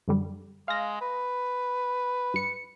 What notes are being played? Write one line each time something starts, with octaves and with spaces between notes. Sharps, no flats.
F#2 D3 G3
G#3 F5 A#6
B4
G2 C#7